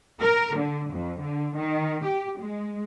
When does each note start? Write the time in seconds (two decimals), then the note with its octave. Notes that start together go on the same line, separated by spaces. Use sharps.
0.21 A#4
0.57 D3
0.91 F2
1.22 D3
1.57 D#3
2.05 G4
2.40 G#3